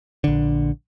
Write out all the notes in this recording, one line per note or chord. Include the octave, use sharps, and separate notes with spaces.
A#1 D3